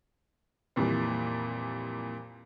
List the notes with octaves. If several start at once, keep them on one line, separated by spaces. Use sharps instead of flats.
F2 A#2 E3 G3